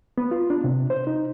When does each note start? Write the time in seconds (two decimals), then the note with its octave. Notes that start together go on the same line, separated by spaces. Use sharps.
0.18 B3
0.31 F4
0.50 D4
0.64 C3
0.90 C5
1.07 D#4